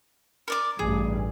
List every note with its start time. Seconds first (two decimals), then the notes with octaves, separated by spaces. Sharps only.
0.48 A#4 D5 D6
0.79 A1 G2 G#4